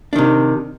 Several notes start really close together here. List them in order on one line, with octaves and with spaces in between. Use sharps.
D4 D#3 C3